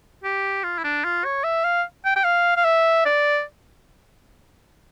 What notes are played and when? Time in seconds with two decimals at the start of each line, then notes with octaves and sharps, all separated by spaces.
0.24 G4
0.64 F4
0.78 E4
0.84 D4
1.04 F4
1.25 C#5
1.44 E5
1.64 F5
2.05 G5
2.16 G5
2.24 F5
2.57 F5
2.65 E5
3.06 D5